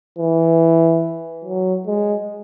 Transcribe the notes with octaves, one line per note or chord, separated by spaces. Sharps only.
E3
F#3
G#3